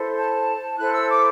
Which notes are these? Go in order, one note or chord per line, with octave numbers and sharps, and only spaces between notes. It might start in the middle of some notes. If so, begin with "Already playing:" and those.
Already playing: E4 A4 C5
A5
E4 A4 C5 F#6
E6
D6